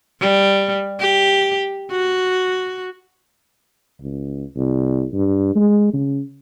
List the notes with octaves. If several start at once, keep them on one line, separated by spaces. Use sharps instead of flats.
G3
G4
F#4
C#2
C2
G2
G#3
C#3